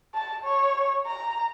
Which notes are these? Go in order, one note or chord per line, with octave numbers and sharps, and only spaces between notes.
A5
C#5
A#5